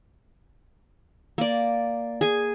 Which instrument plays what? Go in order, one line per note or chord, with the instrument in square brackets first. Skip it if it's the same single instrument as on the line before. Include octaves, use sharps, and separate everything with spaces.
[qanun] A#3 D5
G#4 G#5